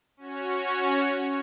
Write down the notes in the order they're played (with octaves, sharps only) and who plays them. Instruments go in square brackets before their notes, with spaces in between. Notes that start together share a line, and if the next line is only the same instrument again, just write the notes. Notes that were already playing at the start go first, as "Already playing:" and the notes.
[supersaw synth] C#4 F#4 C#5